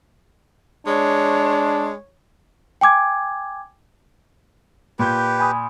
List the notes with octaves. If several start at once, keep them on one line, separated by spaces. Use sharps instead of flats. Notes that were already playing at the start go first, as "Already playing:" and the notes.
G#3 D4 C#5
G5 G#5 D6 G#6
A#2 G4 B4 G6
G#5 B5 D#6